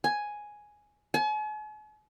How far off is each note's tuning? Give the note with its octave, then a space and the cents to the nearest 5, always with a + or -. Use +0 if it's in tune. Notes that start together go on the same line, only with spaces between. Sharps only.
G#5 +5
G#5 +45